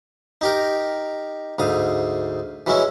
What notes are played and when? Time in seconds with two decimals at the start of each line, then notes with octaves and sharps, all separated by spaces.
0.41 D#4 G4 A#4
1.59 D2 G#2 F5 D#6
2.66 E3 F#3 G#3 C#4 E4